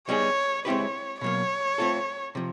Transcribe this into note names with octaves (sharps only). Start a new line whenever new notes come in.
G3 B3 D#4 G#4 C#5
G#3 C4 E4 G4 B4 C#5
B2 F#3 A#3 C#5
A3 C4 F4 A4
C3 F3